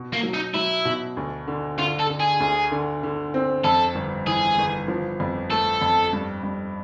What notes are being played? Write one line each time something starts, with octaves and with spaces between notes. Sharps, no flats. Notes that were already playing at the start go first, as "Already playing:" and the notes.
Already playing: B2
A#3
F#3
D#4
F#3 E4
B2
D2
D3
D3 F4
A4
D3
G#4
D2
D3
D3
C4
F2 A4
G1
E3 G#4
G1
F3
F2
A3 A4
F2
G2
G2